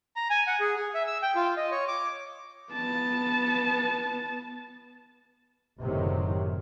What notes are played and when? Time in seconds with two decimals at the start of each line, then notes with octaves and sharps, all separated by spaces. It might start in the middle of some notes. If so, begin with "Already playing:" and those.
0.16 A#5
0.30 G#5
0.47 F#5
0.60 G#4
0.76 G#4
0.95 E5
1.07 E6
1.22 G5
1.36 F4
1.57 D#5
1.71 C#5
1.88 D6
2.73 B3 A5
5.81 F#1 A2 C3 D#3 F#3